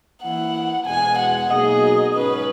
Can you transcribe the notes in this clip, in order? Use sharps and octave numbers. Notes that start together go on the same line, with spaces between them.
E3 A#3 E4 F#5
E2 B2 G#3 G#5
F#5
B2 F#3 A#3 D#4 G#4 D#5
G#2 D#3 F#3 C#4 B4